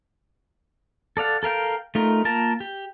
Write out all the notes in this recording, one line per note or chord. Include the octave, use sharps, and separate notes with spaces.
A4 D5 F5 F#5
A4 A#4 F5 G5
A3 D#4 F4 A#4
A#3 F4 A#4 A5
G4